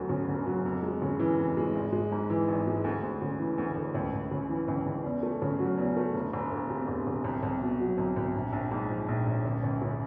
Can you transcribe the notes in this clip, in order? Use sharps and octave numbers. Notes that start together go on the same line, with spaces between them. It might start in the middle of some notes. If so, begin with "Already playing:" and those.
Already playing: E1 D2 F#3
C#3
E1
F#3
F2
G#3
C#3
E3
F2
G#3
G#1
G#3
G#2
E3
G#1
G#3
D2
D2
C#3
E3
D2
D2
C#2
C#2
C#3
E3
C#2
C#2
E2
A3
C#3
F#3
E2
A3
E1
E1
D2
C3
E1
E1
C2
C2
B2
F#3
C2
C2
A#1
A#1
G#2
F3
A#1
A#1
C#2
C#2
C#3